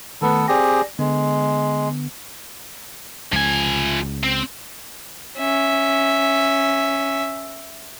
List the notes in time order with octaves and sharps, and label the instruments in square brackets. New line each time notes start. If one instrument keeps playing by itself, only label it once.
[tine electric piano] D#3 A3 B4 [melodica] B3 A4
[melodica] C4 G4 G#4 [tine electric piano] D5 A#6
[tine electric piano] D3 B3 [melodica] G#3
[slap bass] C#2 [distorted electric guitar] F3 G#5
[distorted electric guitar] C4
[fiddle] C#4 E5